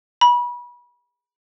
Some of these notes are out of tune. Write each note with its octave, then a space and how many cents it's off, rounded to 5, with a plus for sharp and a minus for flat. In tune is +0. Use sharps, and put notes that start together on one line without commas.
B5 -30